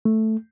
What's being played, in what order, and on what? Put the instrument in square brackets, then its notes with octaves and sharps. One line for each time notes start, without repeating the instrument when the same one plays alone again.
[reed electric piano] A3